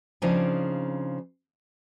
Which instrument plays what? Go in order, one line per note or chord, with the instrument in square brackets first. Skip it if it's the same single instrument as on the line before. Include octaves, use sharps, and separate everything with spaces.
[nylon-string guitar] C#3 F3 C4 D4 D#4 G#4